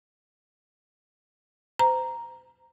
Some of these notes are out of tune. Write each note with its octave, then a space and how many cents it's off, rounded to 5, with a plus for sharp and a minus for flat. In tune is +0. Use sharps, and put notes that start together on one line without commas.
C5 -35 A#5 +0